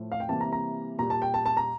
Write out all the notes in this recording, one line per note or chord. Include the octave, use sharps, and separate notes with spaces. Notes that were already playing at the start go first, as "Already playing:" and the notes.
Already playing: A2 F3
F5
G5
C3 E3 G3 A#3 A5
A#5
A#5
A#2 G3 A#3 A#5
A5
G5
A5
A5
A#5